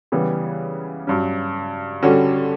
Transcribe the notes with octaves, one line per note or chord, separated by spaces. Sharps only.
C#3 E3 G3 B3
G2 F#3 C#4
D3 G3 C#4 F#4